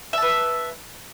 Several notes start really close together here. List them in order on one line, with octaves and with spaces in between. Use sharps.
E5 A5 B4